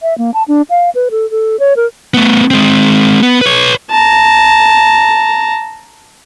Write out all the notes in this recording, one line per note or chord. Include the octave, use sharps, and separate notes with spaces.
E5
A#3
A5
D4
F5
B4
A4
A4
C#5
A#4
A3 B3
G#3 C4
B3
B4 C#5
A5 A#5